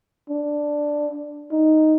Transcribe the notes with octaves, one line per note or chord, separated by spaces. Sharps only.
D4
D#4